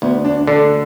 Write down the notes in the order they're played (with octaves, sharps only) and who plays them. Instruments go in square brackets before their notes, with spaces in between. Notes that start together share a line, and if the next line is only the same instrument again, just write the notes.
[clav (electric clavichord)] D2 [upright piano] B3
[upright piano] D4
[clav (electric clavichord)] D3 [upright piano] D4